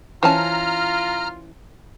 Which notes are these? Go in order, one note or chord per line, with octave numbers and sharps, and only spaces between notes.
E3 C#4 F4 C5 C#5 A5 A#5 F6